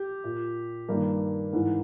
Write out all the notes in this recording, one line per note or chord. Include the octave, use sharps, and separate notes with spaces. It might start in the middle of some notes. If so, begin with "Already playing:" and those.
Already playing: G4
A#2
G2 D#3 A#3
G#2 E3